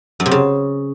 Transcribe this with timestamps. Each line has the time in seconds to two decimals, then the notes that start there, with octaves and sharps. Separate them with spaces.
0.20 F#2
0.26 C3
0.31 C#3